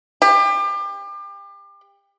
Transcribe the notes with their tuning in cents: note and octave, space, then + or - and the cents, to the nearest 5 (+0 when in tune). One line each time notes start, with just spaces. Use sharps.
G4 +30